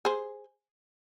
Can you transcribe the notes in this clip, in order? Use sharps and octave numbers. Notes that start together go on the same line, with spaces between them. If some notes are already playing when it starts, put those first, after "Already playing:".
G#4 C5